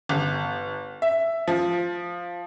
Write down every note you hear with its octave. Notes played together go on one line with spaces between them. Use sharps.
G1
E5
F3